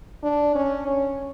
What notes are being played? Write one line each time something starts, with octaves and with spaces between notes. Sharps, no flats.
D4
C#4
C#4